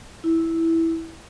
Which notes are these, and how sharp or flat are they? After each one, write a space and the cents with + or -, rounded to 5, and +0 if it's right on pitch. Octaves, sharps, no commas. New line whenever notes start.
E4 -5